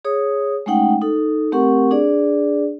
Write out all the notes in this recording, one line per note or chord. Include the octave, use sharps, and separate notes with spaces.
G#4 C#5 D#6
G#3 A3 C#4 D#4 F#5 G5
D#4 A4
A3 C4 G4 A#4 F#5 C#6
D4 G#4 D5